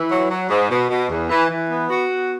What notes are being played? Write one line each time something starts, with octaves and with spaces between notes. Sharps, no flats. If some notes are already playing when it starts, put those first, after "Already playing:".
Already playing: E3
F#3
F#3
G#2
B2
B2
E2
E3
E3
B3
F#4
B3